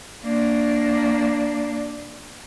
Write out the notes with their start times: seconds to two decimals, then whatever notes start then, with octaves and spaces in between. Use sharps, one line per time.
0.23 A#3 D4